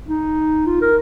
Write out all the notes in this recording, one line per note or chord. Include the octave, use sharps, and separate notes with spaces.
D#4
F4
A#4